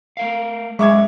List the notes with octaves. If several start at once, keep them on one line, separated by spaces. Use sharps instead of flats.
A3 A#4 F5
F#2 G#3 C#4 E5 C#6 D6 G#6